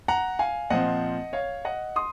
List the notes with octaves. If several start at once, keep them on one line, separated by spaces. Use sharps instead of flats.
F#5 A#5
F5 G#5
A#2 F3 C4 D#5 F#5
C#5 F5
D#5 F#5
C6 D#6